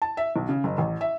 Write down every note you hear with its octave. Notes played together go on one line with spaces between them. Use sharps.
A5
E5
B1
C#3
F#1
A1
E5